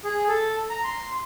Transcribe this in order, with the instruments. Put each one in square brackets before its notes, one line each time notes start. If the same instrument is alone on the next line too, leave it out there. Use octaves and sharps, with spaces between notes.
[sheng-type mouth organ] G#4
A4
A#5
C6